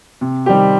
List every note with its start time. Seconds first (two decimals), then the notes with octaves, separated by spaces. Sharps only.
0.21 C3
0.46 D#3 G3 C4 G4